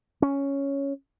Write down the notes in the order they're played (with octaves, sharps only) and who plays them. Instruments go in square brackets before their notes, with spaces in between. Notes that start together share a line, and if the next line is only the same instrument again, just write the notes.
[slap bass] C#4